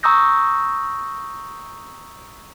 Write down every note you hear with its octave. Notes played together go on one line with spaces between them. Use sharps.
A#5 C#6 D#6 E6 G6 A#6